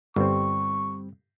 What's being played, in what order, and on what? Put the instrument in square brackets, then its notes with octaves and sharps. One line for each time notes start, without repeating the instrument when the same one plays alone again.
[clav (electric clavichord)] G1 [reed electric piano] G3 C4 [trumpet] C#6